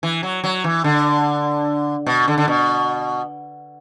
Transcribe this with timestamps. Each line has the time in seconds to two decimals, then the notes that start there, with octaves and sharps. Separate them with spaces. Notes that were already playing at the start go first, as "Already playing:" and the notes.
0.03 E3
0.23 F#3
0.44 F#3
0.64 E3
0.84 D3
2.06 B2
2.28 D3
2.38 D3
2.48 B2